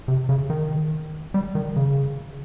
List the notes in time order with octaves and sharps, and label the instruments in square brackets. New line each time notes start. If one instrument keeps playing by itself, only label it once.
[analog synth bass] C3
C#3
D#3
G3
D#3
C#3